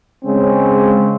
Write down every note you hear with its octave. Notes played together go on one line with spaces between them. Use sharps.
C#3 G#3 C4 C#4